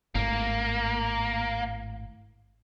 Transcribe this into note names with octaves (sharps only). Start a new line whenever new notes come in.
G#1 A2 A#3